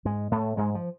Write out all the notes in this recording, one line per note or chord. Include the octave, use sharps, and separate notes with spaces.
G#2 G#3
A2 A3
G#2 G#3
F3